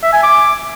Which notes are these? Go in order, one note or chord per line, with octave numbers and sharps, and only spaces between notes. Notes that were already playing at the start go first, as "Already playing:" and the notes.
E5
G#5
D6